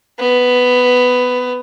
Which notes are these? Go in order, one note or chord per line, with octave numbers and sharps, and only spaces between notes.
B3